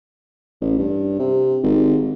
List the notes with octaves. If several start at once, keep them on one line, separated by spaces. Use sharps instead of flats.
A1
G2
C3
G#1